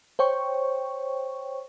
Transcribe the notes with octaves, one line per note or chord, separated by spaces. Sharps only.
C5 C#5 G5 C#6